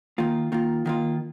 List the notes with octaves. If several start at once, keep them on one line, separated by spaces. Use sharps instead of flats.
D#3 A#3 F4
D#3 A#3 F4
D#3 A#3 F4